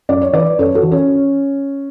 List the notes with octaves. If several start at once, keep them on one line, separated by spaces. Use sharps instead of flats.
F#2 D5
C#5
E3 B4 D5
F#2 A4 C#5
F#4 A4
E3
C#4